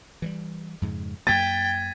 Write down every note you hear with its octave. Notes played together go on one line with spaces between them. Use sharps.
E3 F#3 G3
F2 G#2 C#3
F#2 A#3 G5 G#6 A6 B6 D#7